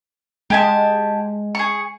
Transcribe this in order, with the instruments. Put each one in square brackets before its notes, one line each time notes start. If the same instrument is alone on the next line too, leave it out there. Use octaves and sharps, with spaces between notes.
[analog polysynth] G#3 [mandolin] G4 G#5 A5
[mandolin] G#4 C#6